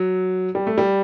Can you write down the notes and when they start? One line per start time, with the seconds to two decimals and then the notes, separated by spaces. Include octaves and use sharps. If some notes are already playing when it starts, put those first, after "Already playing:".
Already playing: F#3
0.55 G3
0.67 A3
0.78 G3